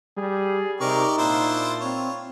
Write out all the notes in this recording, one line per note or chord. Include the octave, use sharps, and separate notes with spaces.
G3 G#4
C3 D#4 G4 A#4 D5 C#6
A#2 D4 E4 F4 C5
C4 C#5